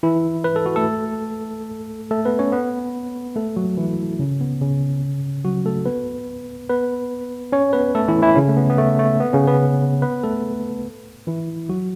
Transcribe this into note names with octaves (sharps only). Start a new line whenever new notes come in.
E3 E4
B4
A4
F#4
A3 A4
A3 A4
B3 B4
C#4 C#5
B3 B4
A3 A4
F#3 F#4
E3 E4
C#3 C#4
B3
C#3 C#4
F#3 F#4
A3 A4
B3 B4
B3 B4
C#4 C#5
B3 B4
A3 A4
E3 E4
E3 E4
C#3 C#4
A3
B3
B3
A3
A3
B3
C#3 C#4
B3 B4
B3 B4
A3 A4
E3 E4
F#3 F#4